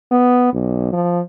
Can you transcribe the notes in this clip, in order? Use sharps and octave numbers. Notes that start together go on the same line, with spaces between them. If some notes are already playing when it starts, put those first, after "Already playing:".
B3
B1
F3